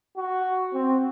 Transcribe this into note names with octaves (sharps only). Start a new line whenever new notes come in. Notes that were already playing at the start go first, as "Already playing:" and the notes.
F#4
C4